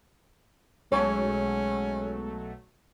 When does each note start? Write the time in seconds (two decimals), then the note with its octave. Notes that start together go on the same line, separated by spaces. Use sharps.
0.92 B1 F#3 G#3 A3 C#4 C#5